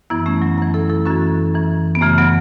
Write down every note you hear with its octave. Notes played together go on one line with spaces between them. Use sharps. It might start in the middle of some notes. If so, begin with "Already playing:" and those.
F#2 E3 B3 E4
A3 C#4
F#3 B3
F#2 E3 A3
E4 A4
E4 A4
F#2 E3 C#4 F#4
F#2 E3
B3
F#2 C#3 E3 A3
F#3 B3